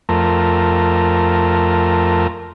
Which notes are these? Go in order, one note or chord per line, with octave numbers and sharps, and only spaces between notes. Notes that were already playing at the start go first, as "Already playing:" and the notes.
F2 A3 A#4